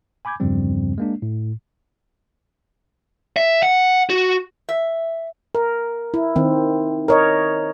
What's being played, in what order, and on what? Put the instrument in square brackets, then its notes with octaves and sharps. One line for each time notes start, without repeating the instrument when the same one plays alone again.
[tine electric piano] G#5 B5 D6 G6 G#6
E2 G2 C#3 F3 G3 C4
G#3 A#3 D4
A2
[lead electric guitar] E5
F#5
F#4
[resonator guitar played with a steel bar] E5
[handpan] A#4
E4
D#3 C4
A#4 C#5 D#5